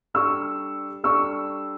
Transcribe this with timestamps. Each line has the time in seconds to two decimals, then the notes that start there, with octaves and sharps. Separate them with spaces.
0.14 G3 D4 A4 C#6 E6
1.04 G3 D4 A4 C#6 E6